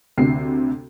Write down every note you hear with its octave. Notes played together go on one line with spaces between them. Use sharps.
D2 C3 C7